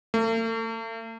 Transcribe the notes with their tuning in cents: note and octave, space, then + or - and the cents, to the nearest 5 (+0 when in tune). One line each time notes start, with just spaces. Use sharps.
A3 +45